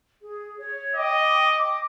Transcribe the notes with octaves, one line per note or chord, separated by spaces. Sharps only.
G#4
C#5
D#5 G5 D6